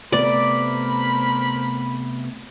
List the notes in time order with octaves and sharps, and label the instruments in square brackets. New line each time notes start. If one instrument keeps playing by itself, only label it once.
[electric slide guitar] C3 A3 B3 [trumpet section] A#4 C5 B5 [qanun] D5